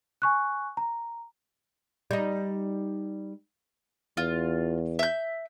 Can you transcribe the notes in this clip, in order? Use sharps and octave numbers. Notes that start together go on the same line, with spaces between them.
G#5 C#6 F#6
A#5
G3 D#4
E2 F4
E5 G6